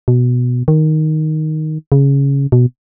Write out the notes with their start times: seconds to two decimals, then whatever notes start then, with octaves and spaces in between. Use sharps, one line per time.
0.08 B2
0.68 D#3
1.92 C#3
2.52 B2